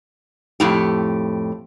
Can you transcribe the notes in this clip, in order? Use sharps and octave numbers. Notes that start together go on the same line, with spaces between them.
F2 A2 G4